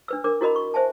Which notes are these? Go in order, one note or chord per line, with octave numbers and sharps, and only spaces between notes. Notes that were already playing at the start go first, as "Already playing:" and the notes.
D4 B4 E6
D4 A#4 D6
E4 F#4 A#4 D#5 B5
C#6
C5 E5 G#5 A5